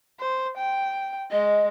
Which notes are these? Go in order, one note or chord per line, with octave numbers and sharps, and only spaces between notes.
C5
G5
G#3 D#5